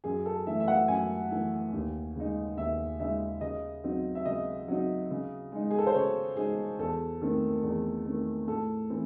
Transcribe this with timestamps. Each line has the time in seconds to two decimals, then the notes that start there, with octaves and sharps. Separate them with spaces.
0.04 F#2 G#4
0.26 A4
0.47 E3 A3 E5
0.60 E5
0.68 F#5
0.88 F#2 G#5
1.31 E3 A3
1.73 D#2
2.16 C#3 G#3 D#4
2.57 D#2 E5
2.99 C#3 G#3 D#4 E5
3.41 C#3 D#5
3.84 F#3 C4 D#4
4.15 E5
4.25 C#3 D#5
4.68 F#3 C4 D#4
5.11 C#3
5.52 G#3 D#4
5.71 G#4
5.78 A4
5.87 C5
5.95 C#3 C#5
6.36 G#3 D#4 G#4
6.79 E2 A4
7.22 D#3 A3 C4
7.63 E2
8.06 D#3 A3 C4
8.47 A2 A4
8.90 E3 C4 E4